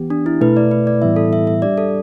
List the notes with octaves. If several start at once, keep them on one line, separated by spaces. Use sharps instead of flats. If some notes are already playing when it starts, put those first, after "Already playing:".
Already playing: E3 B3 G4
D4
E4
B2 A3 E4 B4
D5
B4
D5
A2 E3 G3 B3 E4 E5
A4
E5
E5
G3 D4 G4 D5
A4